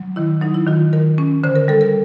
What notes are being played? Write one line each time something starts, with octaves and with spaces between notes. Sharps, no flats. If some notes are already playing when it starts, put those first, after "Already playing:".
Already playing: F#3
D#3 E4
F#3 D#4
E4
D#3 F4
D#3 A#4
C#4
D3 C5
A#4
G3 A4
A#4